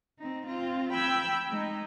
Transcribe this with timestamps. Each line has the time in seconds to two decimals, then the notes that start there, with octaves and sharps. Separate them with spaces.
0.18 C4 D#4
0.47 C4 F4
0.94 G5 B5 E6 G6 G#6
1.50 G#3 D#4